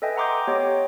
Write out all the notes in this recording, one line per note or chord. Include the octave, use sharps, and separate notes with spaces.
A4 B4 D#5 E5 G5 G#5
F#5 A#5 C6 D6 D#6 G6
B3 G4 C#5 D#5 G5